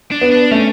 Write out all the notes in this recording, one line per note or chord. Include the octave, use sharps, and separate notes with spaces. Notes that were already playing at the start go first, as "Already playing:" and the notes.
D4
B3
D4
A3 C#4